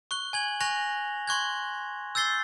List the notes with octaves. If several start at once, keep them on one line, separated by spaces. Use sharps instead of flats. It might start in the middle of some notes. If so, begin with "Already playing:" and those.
C#6 F#6 G7
G#5 G#6 F#7
G#5 C#6 F#6 A#6 F7
C6 C#6 F#6 G#6
E6 G6 A6 C7 G7